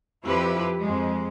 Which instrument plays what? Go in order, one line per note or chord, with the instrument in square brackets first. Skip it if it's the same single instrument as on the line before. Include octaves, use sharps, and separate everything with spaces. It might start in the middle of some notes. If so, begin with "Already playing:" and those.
[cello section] F2 F3 E4 G4 B4
F2 G#3